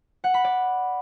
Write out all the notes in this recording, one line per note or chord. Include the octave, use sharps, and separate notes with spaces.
F#5
B5
D5